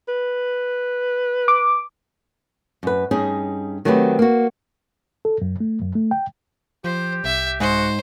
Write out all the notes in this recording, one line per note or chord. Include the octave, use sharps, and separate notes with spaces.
B4
D6
F#2 B4
G2 C#4 D#4 G#4
D#3 F#3 A3 C4 G4 B4
A#3 F#4
A4
F#2
A3
F#2
A3
G5
F3 G4 C5
C2 E5
G#2 F#4 C5